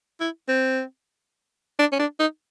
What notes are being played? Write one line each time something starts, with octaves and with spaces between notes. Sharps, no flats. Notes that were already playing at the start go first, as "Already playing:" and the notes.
E4
C4
D4
C#4
D4
D#4